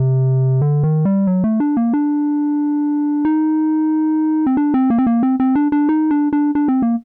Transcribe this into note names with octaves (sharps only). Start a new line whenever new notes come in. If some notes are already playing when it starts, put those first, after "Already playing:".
Already playing: C3
D3
D#3
G3
F#3
A3
D4
A#3
D4
D#4
C4
D4
C4
A#3
C4
A#3
C4
C4
D4
D4
D#4
D4
D4
D4
C4
A#3